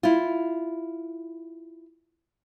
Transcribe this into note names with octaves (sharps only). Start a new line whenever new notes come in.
E4 F4